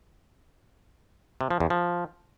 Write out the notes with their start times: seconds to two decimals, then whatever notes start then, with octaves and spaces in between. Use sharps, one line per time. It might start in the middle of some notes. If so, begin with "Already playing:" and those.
1.41 C3
1.50 F3
1.60 E2
1.70 F3